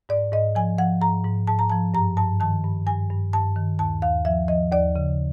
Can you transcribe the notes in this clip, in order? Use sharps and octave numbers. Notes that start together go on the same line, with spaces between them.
G#2 D5
G#2 D#5
F3 G#5
F3 F#5
G#2 A#5
G#2
G#2 A5
A#5
F3 A5
G2 A#5
G2 A5
D#3 A5
G2
G2 G#5
G2
G2 A5
D#3
D#2 A5
D#2 F5
F3 E5
F3 D#5
D#2 D5
C#3